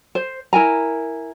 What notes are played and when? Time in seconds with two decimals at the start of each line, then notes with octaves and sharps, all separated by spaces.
0.15 C5
0.53 E4 A#4 G#5 A#5